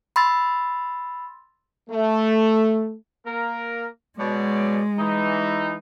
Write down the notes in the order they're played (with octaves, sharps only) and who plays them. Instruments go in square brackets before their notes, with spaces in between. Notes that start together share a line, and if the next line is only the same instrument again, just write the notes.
[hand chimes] B5 C6 E6 A6
[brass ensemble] A3
[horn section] A#3 A#4
[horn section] B2 C#5 D5 [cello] G#3
[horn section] E3 D#4